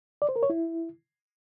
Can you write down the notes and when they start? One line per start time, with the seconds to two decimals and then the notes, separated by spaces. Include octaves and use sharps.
0.22 D5
0.29 C5
0.36 A#4
0.43 C#5
0.50 E4